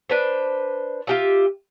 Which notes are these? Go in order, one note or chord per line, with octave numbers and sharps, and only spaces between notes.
D4 B4 C5
F4 G4 E5